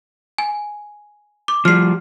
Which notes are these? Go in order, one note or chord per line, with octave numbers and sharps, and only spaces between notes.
G#5
D6
F3 G3 F6 C7